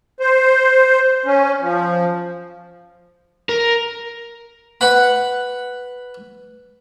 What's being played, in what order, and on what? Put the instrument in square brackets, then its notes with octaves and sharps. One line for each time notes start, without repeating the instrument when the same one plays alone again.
[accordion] C5
C#4
F3
[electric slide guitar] A#4
[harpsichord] B4 F#5 B5